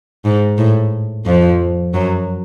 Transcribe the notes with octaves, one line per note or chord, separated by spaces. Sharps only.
G#2
A2
F2 F3
F#2 F#3